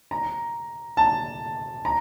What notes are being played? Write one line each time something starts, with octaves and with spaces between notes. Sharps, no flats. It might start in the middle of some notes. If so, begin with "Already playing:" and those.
A#5
A5
A#5